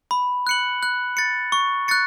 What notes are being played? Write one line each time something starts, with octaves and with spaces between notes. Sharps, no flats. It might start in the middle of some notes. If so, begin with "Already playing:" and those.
B5
F#6 C#7 F#7
F#6
A6 C#7
C#6
F#6 A6 C#7